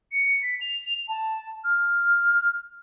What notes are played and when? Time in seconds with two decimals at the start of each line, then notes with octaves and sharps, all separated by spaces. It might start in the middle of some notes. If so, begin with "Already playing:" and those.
0.12 C#7
0.43 B6
0.61 F7
1.08 A5
1.64 F6